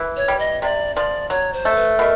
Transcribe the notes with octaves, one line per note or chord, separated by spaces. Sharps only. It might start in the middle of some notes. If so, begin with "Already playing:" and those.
Already playing: E3
C#5
G3
D#5
C3 D5
F3 D5
F#3 C#5
C5
A3
B4
B2 A#4